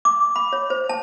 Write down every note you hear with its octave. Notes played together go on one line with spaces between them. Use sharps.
D6
B5
C#5
C5
A5